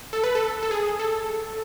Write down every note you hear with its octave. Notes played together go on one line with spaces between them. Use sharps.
A4
B4
A4
A4
G#4
A4